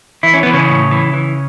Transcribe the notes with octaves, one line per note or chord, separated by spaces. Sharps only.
E3 E4
C#4
E3 B3
C#3 C#4
A2
E3
E3